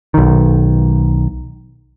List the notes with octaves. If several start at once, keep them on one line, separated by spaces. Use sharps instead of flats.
B1 D#3